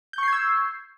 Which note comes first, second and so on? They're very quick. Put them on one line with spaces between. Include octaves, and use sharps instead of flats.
G6 C#6 C7 G#6 E6